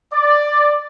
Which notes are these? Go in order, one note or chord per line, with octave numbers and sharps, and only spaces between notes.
D5